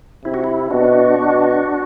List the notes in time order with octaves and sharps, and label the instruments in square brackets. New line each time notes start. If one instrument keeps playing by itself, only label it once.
[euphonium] C3 [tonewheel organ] E4
[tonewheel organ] F#4
E4
[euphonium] B2 [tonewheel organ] D4 F#4
[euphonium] B2